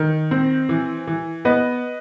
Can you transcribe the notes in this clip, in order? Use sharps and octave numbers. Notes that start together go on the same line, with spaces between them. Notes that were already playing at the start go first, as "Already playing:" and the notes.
Already playing: D#3
C4
E3
E3
B3 B4 D#5